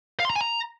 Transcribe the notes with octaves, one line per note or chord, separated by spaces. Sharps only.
F5
C6
A#5
G#5
A#5